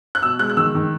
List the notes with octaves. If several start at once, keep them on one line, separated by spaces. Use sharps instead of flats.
F#6
B2 E6
G#3 F#6
F#6
D#3 E6
D#3